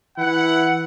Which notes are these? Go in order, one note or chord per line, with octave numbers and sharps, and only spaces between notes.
E3 E4 F#5